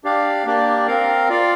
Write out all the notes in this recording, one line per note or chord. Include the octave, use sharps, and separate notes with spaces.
D4 G4 D5 F5
A#3 D4 G4 D5
C4 A#4 F5
F4 D5 F5